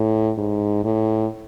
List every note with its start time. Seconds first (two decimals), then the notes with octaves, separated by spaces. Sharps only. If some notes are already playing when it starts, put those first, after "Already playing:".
Already playing: A2
0.38 G#2
0.84 A2